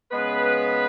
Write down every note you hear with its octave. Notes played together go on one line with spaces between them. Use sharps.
C#3 G#3 B3 B4